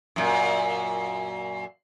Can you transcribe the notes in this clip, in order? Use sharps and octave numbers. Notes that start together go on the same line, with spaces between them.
F#2 A#2